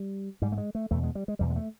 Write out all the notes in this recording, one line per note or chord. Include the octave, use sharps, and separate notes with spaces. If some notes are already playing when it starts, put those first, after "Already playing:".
Already playing: G3
G#2 G3
A3
G#3
A3
E2 B2 A3
G#3
G3
G#3
E2 B2 G3
G#3
A3